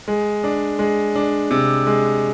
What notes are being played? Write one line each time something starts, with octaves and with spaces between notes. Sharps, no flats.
G#3
D4
G#3
D4
C3
G#3